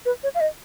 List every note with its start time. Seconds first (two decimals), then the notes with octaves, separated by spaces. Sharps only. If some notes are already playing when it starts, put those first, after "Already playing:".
0.05 B4
0.23 C#5
0.35 F5
0.40 D#5